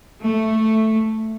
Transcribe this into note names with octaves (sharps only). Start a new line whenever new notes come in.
A3